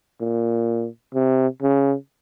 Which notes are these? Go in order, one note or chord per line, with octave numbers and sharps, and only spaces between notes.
A#2
C3
C#3